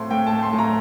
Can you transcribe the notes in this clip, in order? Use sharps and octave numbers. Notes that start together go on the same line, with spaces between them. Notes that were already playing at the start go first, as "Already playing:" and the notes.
Already playing: A2 A3 C4 C6
A2 G5
A5
A3
C6
A2
A#5